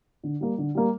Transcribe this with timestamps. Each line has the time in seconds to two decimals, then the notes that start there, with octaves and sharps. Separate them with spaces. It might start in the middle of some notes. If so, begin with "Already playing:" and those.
0.24 D3
0.41 G3 A#3
0.58 D3
0.75 G3 A#3